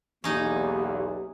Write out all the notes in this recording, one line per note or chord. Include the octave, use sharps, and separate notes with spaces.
B1 E2 A#3 C#4 D#4 G4